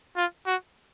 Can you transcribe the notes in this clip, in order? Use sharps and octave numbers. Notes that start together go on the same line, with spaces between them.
F4
F#4